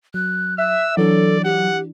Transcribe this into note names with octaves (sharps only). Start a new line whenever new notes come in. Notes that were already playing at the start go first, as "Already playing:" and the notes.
F#3 F#6
E5 E6 F#6
E3 F#3 D4 A4 D5
G4 F#5